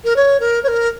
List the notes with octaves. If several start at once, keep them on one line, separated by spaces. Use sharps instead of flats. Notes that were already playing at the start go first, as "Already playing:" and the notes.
A#4
C#5
A#4
C#5
A#4